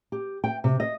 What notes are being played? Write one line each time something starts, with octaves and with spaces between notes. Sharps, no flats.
G4
G5
C3
D#5